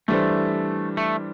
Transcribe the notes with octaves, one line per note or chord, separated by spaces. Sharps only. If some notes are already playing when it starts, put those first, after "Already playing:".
E3 G3 A3 D4 A4 C5
A3